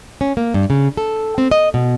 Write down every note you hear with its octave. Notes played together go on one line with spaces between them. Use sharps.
C#4
A#3
G2
C#3
A4
C4
D#5
B2